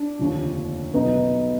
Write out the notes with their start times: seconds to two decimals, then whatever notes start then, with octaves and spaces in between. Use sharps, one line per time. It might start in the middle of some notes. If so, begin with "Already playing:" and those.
Already playing: D4
0.19 F1 D#2 D3 F3
0.94 B1 B2 B3 D#4